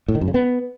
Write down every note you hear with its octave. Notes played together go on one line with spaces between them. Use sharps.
A2
D#3
F#2
C#3
B3